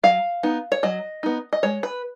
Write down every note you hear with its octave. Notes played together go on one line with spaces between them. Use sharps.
F#3 F5
B3 D#4
C#5
F#3 D#5
B3 D#4
D#5
G#3 C#5
B4